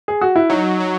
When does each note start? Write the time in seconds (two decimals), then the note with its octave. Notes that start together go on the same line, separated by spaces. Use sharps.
0.08 G#4
0.21 F#4
0.36 E4
0.50 F#3 D#4
0.80 F#3